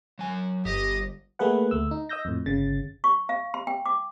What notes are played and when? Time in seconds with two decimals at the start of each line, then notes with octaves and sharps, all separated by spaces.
0.19 F#3 G#5
0.65 G1 G4 D#5
1.39 A3 A#3 G#4 B4 F#5
1.71 D2 A3 E6
1.91 D#4
2.09 D#5 D#6 E6 G6 A#6
2.25 F2 A2
2.46 G1 C#3 A6
3.04 C#6
3.29 F5
3.54 C6
3.67 G5
3.86 D6